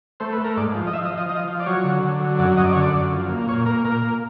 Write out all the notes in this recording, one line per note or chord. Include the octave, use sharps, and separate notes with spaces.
A3 C5
B4
A3
A#4
G#2 D5
F3
D#5
F3 E5
D#5
F3
D#5
F3 D#5
F3
D5
F#3 C#5
D3
D3
F#3
F#2 D5
F#2 D#5
D5
D3 C#5
D5
F#2
F3
A#3
A#2 C#5
A#3 A#4
A#2 A#4
A#3